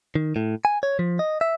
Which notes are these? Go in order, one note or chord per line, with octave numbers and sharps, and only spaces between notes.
D#3
A2
G#5
C#5
F3
D#5
E5